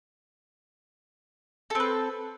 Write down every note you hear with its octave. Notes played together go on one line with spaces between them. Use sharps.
C4 A4 B4